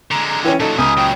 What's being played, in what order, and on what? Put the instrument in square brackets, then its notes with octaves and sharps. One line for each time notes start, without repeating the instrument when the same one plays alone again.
[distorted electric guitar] D3 G#3 [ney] A#5
[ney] A#5
[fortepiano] E3 C#4 [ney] G5
[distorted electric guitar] A#2 F#3 [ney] D#4 [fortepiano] A4
[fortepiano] C#2 [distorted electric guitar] G4 G#5 [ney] A#5 [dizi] D#6
[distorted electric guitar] A#2 F#3 [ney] G5